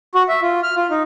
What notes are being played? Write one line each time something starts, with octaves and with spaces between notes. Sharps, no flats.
F#4
E5
F4
F6
F4
D#4